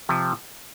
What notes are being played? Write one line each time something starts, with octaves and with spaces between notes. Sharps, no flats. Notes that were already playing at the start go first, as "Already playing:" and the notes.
C3 F3